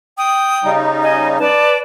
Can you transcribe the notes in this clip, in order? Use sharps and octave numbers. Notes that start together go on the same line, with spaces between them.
G5 D#6
C#3 G3 D#4
D#5 G#5
B4 D5 A5